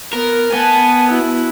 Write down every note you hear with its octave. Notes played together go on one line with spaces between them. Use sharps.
B3 A#4
B3 G#5 A5
E4 F#4